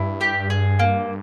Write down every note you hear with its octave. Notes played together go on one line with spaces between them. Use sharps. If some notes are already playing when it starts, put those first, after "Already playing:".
Already playing: G2 E4
G4
G#4
A#3